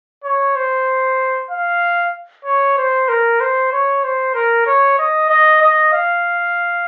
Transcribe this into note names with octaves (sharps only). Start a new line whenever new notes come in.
C#5
C5
F5
C#5
C5
A#4
C5
C#5
C5
A#4
C#5
D#5
D#5
D#5
F5